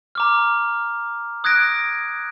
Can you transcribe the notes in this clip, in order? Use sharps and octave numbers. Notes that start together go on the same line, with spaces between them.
A#5 D6 F6
D#6 F#6 G#6 A#6 D7